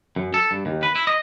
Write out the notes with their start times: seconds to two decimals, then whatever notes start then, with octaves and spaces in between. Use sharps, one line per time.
0.16 F#2
0.34 A4
0.51 G2
0.66 D#2
0.83 B4
0.95 E4
1.07 D#5